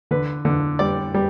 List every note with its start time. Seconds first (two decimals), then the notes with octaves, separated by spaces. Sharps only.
0.11 D3 B4
0.45 D3
0.79 G3 D5
1.14 G3